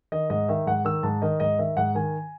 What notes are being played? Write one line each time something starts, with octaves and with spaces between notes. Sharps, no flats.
D#3 D#5
G#2 D#5
D#3 E5
G#2 F#5
D#3 E6
G#2 A5
D#3 D#5
G#2 D#5
D#3 E5
G#2 F#5
D#3 G#5